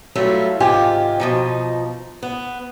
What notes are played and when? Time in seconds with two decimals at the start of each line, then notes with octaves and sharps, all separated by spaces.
0.15 F#3 G3 A3 E4 F4
0.60 G#2 C3 D#3 F4 G4 G#5
1.20 B2 F3 D#4
2.23 B3